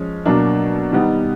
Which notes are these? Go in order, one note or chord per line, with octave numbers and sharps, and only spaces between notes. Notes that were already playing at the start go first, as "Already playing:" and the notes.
Already playing: F3 G#3 C#4
B2 F#3 A#3 D4
D#3 G3 B3 D#4